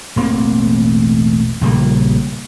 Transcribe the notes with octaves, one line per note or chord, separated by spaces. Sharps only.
E1 A1 A#3 C4
A#1 C#3 G3 A#3